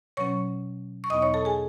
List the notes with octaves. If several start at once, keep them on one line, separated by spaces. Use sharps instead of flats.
B2 F#3 C#4 C#5 C#6
C#6
E2 B2 F#3 B3 D#4 D#5 D#6
C#5 C#6
A4 A5
G#4 G#5